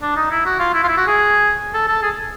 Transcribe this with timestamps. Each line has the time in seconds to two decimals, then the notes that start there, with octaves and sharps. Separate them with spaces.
0.02 D4
0.16 D#4
0.31 E4
0.46 F#4
0.59 F4
0.74 E4
0.84 F4
0.88 E4
0.97 F#4
1.07 G#4
1.74 A4
1.88 A4
2.02 G#4